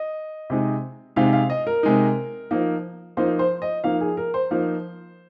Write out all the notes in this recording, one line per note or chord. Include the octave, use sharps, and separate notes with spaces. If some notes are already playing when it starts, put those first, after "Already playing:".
Already playing: D#5
C3 G#3 D#4
C3 G#3 D#4 F5
F5
D#5
A#4
C3 G#3 D#4
F3 A#3 D#4
F3 A#3 D#4 C5
C5
D#5
F3 A#3 D#4 F5
G#4
A#4
C5
F3 A#3 D#4